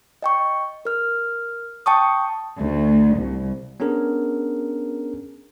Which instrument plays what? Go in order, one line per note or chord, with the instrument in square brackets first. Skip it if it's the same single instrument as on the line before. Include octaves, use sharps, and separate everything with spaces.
[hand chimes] D#5 G5 C#6
A#4 F6
G5 A5 C#6 D#6
[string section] D2
C2
[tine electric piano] B3 C#4 D4 G#4 A#4